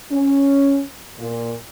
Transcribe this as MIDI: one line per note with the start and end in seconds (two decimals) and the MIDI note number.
0.11 0.81 61
1.19 1.54 46